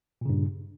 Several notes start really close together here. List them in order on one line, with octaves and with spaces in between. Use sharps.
A#2 C#3 G2